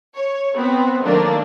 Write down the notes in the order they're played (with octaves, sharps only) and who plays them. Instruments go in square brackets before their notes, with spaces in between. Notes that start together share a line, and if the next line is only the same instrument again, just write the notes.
[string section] C#5
B3 C4
D#3 F#3 A3 A#3 D4